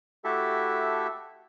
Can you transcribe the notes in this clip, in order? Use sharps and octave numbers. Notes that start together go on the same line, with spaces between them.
A3 E4 F#4 G4 A4 E5